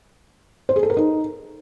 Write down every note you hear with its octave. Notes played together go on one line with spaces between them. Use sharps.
C5
G#4
A4
A#4
D#4